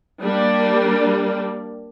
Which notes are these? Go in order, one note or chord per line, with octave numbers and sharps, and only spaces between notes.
G3 A#3 D4